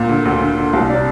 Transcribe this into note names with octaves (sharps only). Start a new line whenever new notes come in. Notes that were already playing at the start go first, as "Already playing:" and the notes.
Already playing: A#2
D3
D2
D3
D3
C2 F5
C3 D5